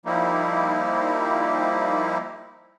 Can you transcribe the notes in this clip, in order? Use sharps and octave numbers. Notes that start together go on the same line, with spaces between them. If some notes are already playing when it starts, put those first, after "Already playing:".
F3 G3 A#3 D#4 E4